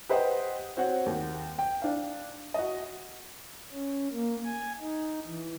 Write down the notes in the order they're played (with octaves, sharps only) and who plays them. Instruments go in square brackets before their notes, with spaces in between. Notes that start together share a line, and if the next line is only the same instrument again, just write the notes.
[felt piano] G4 B4 C5 D#5 F#5 G5
C4 F#4 C#5 F#5
D#2
G5
D4 F5
F#4 D#5
[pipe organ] C#4
A#3
G#5
D#4
E3